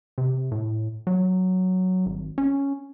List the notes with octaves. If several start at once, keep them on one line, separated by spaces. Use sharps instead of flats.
C3
A2
F#3
G#1
C#4